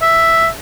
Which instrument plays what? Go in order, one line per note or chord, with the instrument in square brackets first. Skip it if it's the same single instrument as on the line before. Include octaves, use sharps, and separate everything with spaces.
[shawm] E5